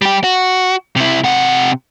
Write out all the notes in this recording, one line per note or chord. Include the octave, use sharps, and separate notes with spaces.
G3 G4
F#4
C3 E4
C3 F#5